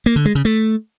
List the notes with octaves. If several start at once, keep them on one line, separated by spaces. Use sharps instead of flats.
A#3
D3
G#3
C#3
A3